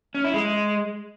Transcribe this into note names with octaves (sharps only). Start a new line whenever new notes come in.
C#4
E4
G#3